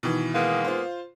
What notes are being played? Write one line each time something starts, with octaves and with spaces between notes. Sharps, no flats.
B2 D#3 E3
G#3 A#3 B3
F4 C5